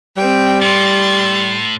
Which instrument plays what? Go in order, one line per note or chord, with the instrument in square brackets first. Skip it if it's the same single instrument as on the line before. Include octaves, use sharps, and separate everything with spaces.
[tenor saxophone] G3 [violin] C4 G5
[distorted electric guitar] A2 [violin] C6 A6